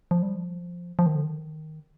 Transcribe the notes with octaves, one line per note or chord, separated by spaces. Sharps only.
F3
G3
F3
F3
D#3
D3
D#3